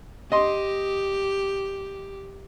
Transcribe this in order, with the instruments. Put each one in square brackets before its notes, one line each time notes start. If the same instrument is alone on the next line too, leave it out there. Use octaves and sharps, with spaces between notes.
[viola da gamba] G4 [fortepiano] D#5 C6